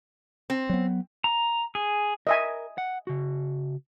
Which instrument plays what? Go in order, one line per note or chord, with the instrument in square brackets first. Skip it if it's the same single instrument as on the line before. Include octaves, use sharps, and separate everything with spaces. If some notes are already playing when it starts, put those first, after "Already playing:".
[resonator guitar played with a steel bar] C4
[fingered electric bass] F#3 B3
[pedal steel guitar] A#5
G#4
[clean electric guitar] A#4 [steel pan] D#5 E5 G#5
[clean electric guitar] F#5
C#3 F#4